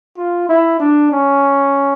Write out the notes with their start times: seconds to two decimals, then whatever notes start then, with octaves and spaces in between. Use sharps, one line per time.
0.17 F4
0.49 E4
0.80 D4
1.12 C#4